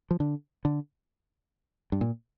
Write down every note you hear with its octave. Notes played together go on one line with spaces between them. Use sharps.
F3
D3
D3
G2
A#2